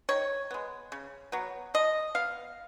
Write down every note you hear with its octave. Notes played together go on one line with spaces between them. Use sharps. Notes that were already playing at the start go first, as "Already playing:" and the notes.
D#3 C#5
G#3 B3
C#3
F#3 B3
F3 D#5
B3 F5